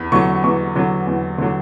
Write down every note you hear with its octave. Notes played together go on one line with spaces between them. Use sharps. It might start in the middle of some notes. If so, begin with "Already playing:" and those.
Already playing: E2 B5
D3 F#3 C#6
E2 C#6
D3 F#3
E2
D3 F#3